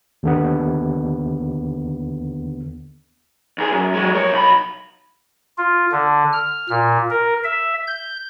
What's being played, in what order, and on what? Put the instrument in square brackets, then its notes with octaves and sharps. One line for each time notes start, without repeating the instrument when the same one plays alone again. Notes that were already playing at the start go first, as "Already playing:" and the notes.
[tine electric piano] D#2 D3 B3
[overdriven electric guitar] D#2 G#4
F#2
F#3 G#3
A#4 C#5
B1 B5
[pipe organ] F4
D3
F6
A#2
A#4
E5
G6